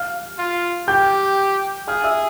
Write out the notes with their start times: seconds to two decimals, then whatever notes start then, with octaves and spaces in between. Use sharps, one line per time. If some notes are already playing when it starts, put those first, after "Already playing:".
Already playing: F5 F6
0.38 F4
0.88 G4 G5 G6
1.87 G#4 F5 F6
2.04 E5 E6